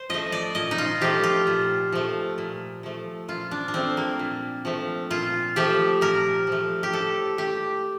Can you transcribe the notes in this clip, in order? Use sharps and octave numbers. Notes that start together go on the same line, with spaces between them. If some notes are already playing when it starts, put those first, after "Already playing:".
Already playing: C5
F3 A3 D#5
D5
A#2 D#5
D#4
F4
F3 A3 G4
F4
A#2
F3 A3
A#2
F3 A3
A#2 F4
D4
D4
F3 A3 C4
A#3
A#2
F3 A3
A#2 F4
F3 A3 G4
A#2 A#4
F3 A3
G4
A2 A4
A3 G4